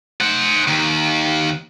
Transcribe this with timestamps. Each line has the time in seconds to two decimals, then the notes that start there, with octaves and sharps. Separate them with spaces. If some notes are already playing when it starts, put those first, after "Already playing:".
0.21 C5 F#5
0.67 D#2